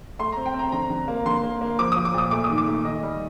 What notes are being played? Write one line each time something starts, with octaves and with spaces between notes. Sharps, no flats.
A3 C6
C4 A#5
G5
C4
A#5
D3 A#5
D3
A#3
D3 C6
A#3
A#3
F3 D6
F3 D#6
D6
A#2 D#6
A3 D6
D#6
D#3
D6
A3
D#3 D#5
G3